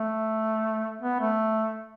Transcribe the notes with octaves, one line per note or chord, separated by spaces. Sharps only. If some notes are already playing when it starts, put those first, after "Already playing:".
Already playing: A3
B3
A3